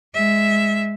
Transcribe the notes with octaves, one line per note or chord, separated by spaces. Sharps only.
G#3 E5